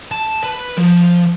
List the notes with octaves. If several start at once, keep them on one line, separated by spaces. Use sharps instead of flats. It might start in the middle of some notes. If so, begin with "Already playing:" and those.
A5
B4
F3